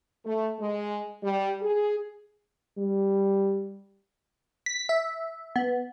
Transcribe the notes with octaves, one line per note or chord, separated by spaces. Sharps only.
A3
G#3
G3
G#4
G3
B6
E5
B3